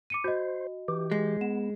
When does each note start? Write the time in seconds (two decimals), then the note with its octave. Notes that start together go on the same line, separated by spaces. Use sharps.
0.10 D6 C#7 D#7
0.24 F#4 C5 D#5
0.88 E3 G4
1.12 G#3
1.41 B3 E7